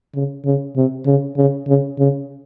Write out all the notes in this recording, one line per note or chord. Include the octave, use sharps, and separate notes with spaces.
C#3
C#3
C3
C#3
C#3
C#3
C#3